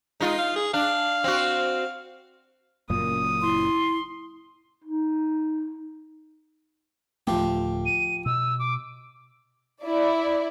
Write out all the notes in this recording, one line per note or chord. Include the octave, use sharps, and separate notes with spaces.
G#3 D#4 F4
F5
G#4
D4 F5
C4 F#4
F#1 F#2 A#2 D#6
E4 C6
D#4
D1 E2 F3 A3 G4
D#7
B2 E6
D6
E4 D5